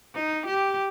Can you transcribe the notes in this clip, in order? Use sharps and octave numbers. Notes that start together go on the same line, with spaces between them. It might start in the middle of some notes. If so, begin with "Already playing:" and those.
D#4
G4